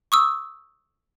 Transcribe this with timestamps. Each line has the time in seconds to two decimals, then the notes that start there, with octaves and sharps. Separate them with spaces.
0.12 C#6 D#6 E6